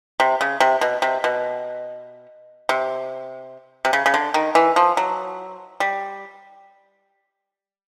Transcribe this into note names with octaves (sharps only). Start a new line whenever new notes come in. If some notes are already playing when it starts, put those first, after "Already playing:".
C3
C#3
C3
B2
C3
B2
C3
C3
C#3
C#3
D3
D#3
E3
F3
F#3
G3